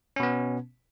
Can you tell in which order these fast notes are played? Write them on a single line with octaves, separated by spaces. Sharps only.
C#4 B2 B3